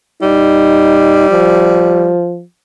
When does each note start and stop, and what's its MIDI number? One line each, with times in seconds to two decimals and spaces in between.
0.22 2.11 55
0.22 1.28 63
1.31 2.42 53